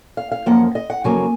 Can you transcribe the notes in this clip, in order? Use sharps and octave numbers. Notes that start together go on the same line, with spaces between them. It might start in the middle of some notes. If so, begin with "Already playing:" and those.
F5
F5
F#2 F3 A#3 F#5
D#5
F#5
F2 C#3 F#3 A#3 G#5